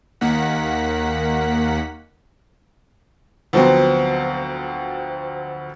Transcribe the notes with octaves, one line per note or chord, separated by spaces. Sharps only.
D#2 D#3 A#3 F#5 B6
D2 F3 F#3 B3 C4